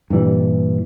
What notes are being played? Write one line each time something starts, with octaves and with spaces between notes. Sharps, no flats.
G2 A#2 E3 G3